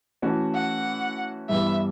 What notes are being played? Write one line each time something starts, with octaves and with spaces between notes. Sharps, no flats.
E3 A3 C#4 F#4
F#5
G2 E3 G3 B3 E5